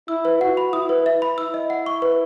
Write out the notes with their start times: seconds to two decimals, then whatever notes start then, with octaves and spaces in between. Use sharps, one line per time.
0.08 E4 E6
0.25 B4
0.40 F#4 F#5
0.57 B5
0.73 E4 D#6
0.89 B4
1.06 E5
1.22 B5
1.37 E4 E6
1.54 D#5
1.70 F#5
1.86 C#6
2.02 B4